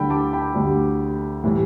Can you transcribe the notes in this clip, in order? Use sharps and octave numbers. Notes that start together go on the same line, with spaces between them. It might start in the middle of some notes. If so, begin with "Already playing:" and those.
Already playing: D2 D3 G3 G5 B5
A5 D6
G5 B5
D2 D3 G3
A2 E3 G3